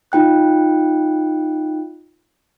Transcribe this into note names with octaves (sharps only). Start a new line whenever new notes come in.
D#4 F4 G5 F#6